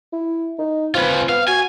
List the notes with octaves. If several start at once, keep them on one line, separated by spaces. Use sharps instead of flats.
E4
D#4
C4 F4 B4
B3 F5
F#4 G#5